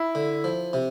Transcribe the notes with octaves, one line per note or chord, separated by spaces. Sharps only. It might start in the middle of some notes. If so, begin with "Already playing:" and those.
Already playing: E4
D3
F3
C3